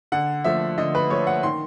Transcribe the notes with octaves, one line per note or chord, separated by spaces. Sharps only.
D3 F#5
F3 A3 E5
D3 D#5
B4
F3 A3 C#5
F#5
D#3 C6